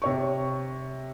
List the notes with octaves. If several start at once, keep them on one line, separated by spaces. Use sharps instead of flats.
C3 C#5 C#6